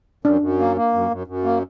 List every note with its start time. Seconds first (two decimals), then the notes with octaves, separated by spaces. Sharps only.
0.25 F#2 D4
0.41 F#2
0.59 A#3
0.77 A#3
0.94 F#2
1.11 F#2
1.27 F#2
1.44 A#3